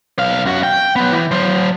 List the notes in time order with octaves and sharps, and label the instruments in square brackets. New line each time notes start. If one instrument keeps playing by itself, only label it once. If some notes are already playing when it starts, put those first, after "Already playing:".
[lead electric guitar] B1 F5
F#2 F#4
G5
F#3 B3
E3
F#3 C5